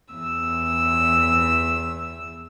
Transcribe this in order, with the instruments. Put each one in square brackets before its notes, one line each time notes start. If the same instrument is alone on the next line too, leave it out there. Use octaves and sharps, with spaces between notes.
[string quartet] E2 E6